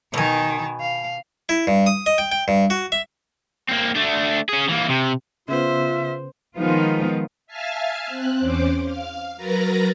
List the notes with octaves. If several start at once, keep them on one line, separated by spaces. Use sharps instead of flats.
B2 D#3 G#5
F5
E4
G2
D#6
D#5
G5
G5
G2
F#4
E5
A#3 C4
A3 D4
C#4 G#4
E3 A#3
C3
C#3 B3 F4 C5 E5
D#3 F3 G#3 B3 D#4 F4
E5 F5 G#5 A5 F6
C4 F#6
E2 C#4 C5 D6
F5
F#3 A#4 B4 A#5 A6 A#6